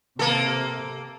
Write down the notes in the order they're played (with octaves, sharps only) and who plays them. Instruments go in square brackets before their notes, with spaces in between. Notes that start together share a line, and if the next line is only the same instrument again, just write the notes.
[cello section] C3 [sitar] A#3 A4